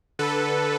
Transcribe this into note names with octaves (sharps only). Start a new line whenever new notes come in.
D3 A4 B4